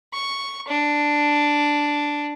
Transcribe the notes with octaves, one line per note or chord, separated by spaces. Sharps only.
C#6
D4